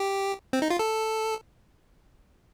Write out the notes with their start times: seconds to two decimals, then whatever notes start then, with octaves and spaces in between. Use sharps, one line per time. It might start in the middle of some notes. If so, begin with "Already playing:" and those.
Already playing: G4
0.53 C4
0.62 D#4
0.70 F4
0.79 A4